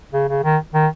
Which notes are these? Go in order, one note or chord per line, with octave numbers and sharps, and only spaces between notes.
C#3
C#3
D#3
D#3